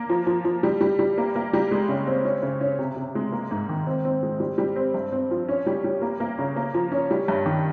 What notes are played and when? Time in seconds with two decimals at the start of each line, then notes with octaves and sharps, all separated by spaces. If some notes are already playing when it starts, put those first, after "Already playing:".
Already playing: A#3
0.09 F3
0.27 F3
0.45 F3
0.63 G3
0.81 G3
0.99 G3
1.18 A#3
1.36 A#3
1.53 G3
1.71 G#3
1.89 C#3
2.07 C4
2.25 C#4
2.42 C#3
2.61 C#4
2.79 C3
2.96 C3
3.15 G#3
3.32 A#3
3.51 G#2
3.69 D#3
3.87 C4
4.05 C4
4.23 G#3
4.40 G3
4.58 G3
4.76 C4
4.94 G2
5.12 C4
5.31 F3
5.48 C#4
5.66 G3
5.84 G3
6.02 A#3
6.20 A#3
6.38 C#3
6.56 A#3
6.74 F3
6.92 C#4
7.11 G3
7.28 G2
7.46 D#3